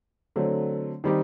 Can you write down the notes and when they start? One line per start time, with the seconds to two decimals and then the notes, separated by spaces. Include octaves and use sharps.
0.36 D3 F#3 A3 C4
1.04 D#3 G3 C4 D#4 G4